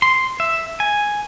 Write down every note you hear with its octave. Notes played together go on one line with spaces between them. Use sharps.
C6
E5
G#5